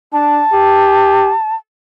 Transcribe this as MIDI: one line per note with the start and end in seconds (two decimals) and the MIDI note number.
0.13 0.44 62
0.13 1.55 81
0.53 1.33 67